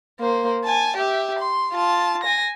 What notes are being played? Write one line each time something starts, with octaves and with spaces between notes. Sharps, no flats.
A#3 C5
G#5 A5
G4 E5
C6
F4 A5
G#5 A#6